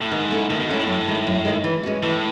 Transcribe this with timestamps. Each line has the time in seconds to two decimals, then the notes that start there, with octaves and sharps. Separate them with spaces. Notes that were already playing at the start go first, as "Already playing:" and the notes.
0.01 A2
0.11 G#2 D#3
0.31 A3 C#4 E4
0.50 A2 D#3
0.59 B2
0.69 G#2 A3 C#4 E4
0.79 A2
0.88 F#2
1.08 D#3 G#3
1.27 F#2
1.45 D#3 G#3
1.64 E3
1.83 G#3 C#4 F#4
2.02 A2 E3